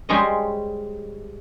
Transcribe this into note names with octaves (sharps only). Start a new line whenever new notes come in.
G3 G#3 G#4 C5 C#5 D#5